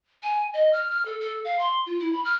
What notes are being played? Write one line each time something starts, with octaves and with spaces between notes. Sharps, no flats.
G#5
D#5
F6
F6
A4
A4
F5
C6
F4
E4
B5
F6